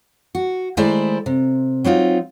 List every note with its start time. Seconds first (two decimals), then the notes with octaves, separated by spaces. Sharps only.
0.35 F#4
0.77 D#3 G#3 A3 E4 C5 D5
1.26 C3
1.84 F#3 C4 D#4 F4